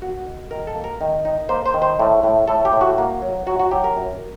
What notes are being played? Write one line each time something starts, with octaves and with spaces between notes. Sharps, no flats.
A#3 F#4
D#3
D#3 A#4
A4
A#3
A#4
D#3
D#4
A#3 C5
C5
D#3
C5
A2
A2
A2 A4
G4
A2
F#4
A#3
F#3
F#3 F#4
F#4
F#3 G4
A#4
F#2